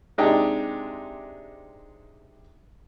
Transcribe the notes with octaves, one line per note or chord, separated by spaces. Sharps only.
C3 G#3 D4 D#4 G4